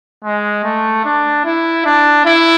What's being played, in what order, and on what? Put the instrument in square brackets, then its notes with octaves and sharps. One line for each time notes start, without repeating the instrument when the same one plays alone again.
[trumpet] G#3
A3
D4
E4
D4
E4